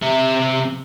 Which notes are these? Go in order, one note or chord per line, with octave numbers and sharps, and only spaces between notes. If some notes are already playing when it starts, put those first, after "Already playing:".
C3 E5